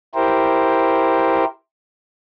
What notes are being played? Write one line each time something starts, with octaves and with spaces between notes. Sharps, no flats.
E4 G4 A#4 C5